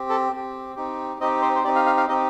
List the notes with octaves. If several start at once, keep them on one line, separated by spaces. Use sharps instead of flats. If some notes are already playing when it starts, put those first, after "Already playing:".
Already playing: C4 G4
A4
C4 G4
C4 D#4 G4
C4 D#4 G4 D#5
C5
C5
C4 D#4 G4 D5
F5
F5
F5
C4 D#4 G4 D#5